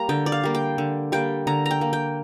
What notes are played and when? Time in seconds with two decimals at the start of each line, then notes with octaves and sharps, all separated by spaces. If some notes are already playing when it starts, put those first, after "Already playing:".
Already playing: G3 A#3 A#5
0.09 D3 G5
0.26 D5
0.32 F5
0.44 G3 A#3
0.55 G5
0.78 D3
1.12 G3 A#3 G5
1.47 D3 A#5
1.66 A#5
1.71 G5
1.81 A#3
1.93 G5